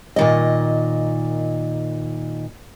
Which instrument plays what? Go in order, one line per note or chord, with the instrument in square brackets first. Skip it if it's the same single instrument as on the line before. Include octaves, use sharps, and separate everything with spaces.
[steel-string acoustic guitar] A#2 D#3 D#5